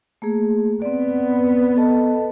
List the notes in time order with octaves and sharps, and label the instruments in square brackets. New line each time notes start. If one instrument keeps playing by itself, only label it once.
[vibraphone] A3 A#3 G#4
[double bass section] B3 [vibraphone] C4 D5
[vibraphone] A4 D#5 A5